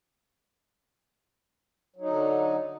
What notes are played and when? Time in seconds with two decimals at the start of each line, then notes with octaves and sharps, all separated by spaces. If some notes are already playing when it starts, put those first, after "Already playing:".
1.96 F#3
2.01 D#4
2.06 D3